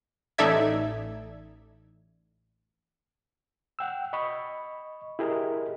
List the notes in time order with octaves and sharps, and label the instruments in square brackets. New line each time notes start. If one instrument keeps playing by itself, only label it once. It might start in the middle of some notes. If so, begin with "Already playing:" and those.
[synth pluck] A1 D#4 A4 D5 E5 G#6
[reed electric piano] F#5 G5 E6
D#5 B5 C#6
E4 G4 G#4 A#4 D#5